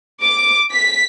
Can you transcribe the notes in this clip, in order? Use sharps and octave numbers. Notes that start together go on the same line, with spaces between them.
D6
B6